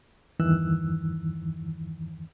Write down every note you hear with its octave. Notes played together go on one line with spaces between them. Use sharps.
E2 G2 D#3 E3 E6 F#6